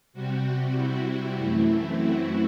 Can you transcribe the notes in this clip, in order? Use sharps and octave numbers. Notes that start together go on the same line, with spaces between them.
C3 G3 C4 F#4
E4
F#2 E3 A3 C4
F#4